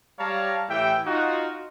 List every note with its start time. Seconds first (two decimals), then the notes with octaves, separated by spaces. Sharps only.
0.19 G3 C#5 D5 F5 A5 A#5
0.68 A2 E3 G4 E5 G5
1.06 D#4 F4 F#4